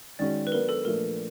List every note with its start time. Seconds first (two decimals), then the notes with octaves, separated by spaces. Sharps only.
0.19 D#3 G#3 C#4 F#4 D5
0.47 B4
0.52 F#3 B3 D4 A#4
0.69 A4
0.85 A#2 F3 A3 D4 A#4